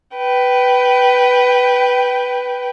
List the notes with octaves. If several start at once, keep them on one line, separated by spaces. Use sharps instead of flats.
B4 G5